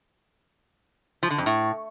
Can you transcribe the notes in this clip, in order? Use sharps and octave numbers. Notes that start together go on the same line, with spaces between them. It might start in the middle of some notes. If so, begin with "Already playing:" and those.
F3
D3
F2
A2